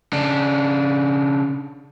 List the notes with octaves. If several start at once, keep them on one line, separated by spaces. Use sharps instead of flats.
C#3 D4